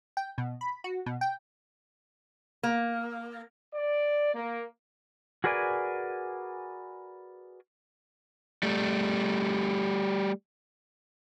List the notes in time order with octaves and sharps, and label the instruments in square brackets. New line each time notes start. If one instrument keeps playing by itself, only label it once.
[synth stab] G5
B2
B5
F#4
B2
G5
[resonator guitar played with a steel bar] A#3
[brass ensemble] D5
A#3
[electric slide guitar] F#4 G#4 A#4 B4 D5 G#5
[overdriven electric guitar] G3 A3